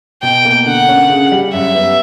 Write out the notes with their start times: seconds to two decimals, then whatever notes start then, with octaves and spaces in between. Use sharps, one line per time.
0.23 B2 G5
0.45 A#3
0.66 D3 F#5
0.88 C#4
1.09 C#3
1.32 G3
1.53 F#2 E5
1.75 B3